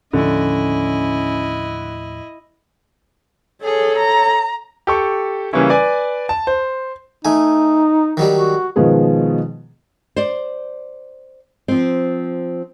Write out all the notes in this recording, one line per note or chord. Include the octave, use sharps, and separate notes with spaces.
D#2 A2 D3 F3 C#4 E4 D#5
G#4 A4 C#5
A#5
G4 A4 C#6
C#3 E3 G3 A#3 C#4 E4
B4 D5 G#5
A5
C5
A3 D#4 G#5
D#3 F#3 G3
F#4
B2 D#3 F3 G#3 B3 G#4
C5 D5
F3 C4